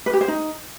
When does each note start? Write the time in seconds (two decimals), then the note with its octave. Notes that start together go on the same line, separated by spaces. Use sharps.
0.06 B4
0.14 G4
0.21 C5
0.28 D#4